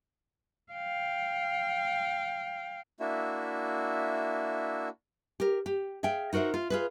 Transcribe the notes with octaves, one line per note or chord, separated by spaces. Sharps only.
F5 G5
A#3 D4 E4 F#4 E5
G4 A#4
G4
G#4 E5 F5 G5
D#4 F#4 A#4 C5 E5
F4
F4 G#4 B4